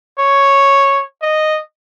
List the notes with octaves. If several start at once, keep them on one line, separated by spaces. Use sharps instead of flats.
C#5
D#5